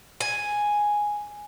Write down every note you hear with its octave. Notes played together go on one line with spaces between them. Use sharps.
G#5